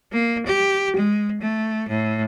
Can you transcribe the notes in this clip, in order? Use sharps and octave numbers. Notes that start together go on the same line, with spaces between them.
A#3
G4
G#3
A3
A2